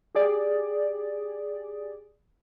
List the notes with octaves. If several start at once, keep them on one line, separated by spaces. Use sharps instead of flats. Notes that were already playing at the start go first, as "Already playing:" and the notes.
G4 G#4 D5